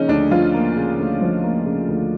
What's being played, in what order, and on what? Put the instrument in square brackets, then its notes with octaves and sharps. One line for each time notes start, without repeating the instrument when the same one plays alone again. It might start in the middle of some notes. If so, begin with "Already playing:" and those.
Already playing: [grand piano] C#3 F3 A#3 [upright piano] C#4 D#4
[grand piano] D2 [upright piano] D4
[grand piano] F3 [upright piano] F4
[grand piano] A#3
C#3
D2
F3
A#3
C#3
D2